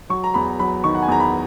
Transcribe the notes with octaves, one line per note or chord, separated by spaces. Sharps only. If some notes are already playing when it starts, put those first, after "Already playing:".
F#3 C#6
A#5
E2 B5
F#3 B5
D#3 C#6
F#5
G#5
E2 A#5
B5